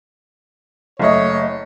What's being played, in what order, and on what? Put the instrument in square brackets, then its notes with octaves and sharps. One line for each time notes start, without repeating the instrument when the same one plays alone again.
[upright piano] F#1 A3 D#5 [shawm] C#5